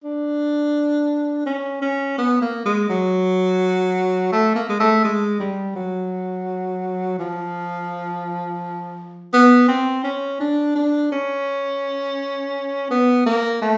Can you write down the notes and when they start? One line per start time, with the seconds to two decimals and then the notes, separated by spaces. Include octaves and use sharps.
0.04 D4
1.46 C#4
1.82 C#4
2.18 B3
2.42 A#3
2.65 G#3
2.89 F#3
4.32 A3
4.56 A#3
4.69 G#3
4.80 A3
5.04 G#3
5.40 G3
5.76 F#3
7.19 F3
9.33 B3
9.68 C4
10.04 C#4
10.40 D4
10.76 D4
11.12 C#4
12.91 B3
13.26 A#3
13.62 A3